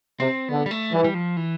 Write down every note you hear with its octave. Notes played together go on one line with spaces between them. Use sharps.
C3 C4
D3 B3
G3
A3
E3 G3
G3
F3
E3